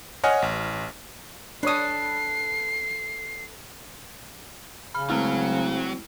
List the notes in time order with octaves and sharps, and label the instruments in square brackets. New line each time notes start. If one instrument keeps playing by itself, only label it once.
[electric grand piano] C#5 D#5 F#5 G#5 F6
A1
[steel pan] D4 C#5 D#6 [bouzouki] A4 B4 [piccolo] C7
[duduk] C#3 [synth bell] B5 F6
[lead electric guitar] F#3 [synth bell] G#3 A3 E4 [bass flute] C4